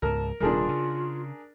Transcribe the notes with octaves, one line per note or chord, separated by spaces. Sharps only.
C#2 G#2 A#4 A5
D#1 C3 G3 D4 F4 G#4 A#4
C#3